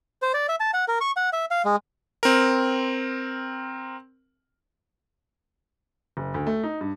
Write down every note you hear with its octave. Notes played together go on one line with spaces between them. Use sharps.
C5
D5
E5
A5
F#5
A#4
C#6
F#5
E5
F5
G#3
C4 A#4
F#1
D2
A3
D#4
G2